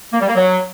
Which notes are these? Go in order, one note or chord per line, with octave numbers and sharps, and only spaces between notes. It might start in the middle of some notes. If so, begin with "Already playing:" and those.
A#3
G3
A#3
F#3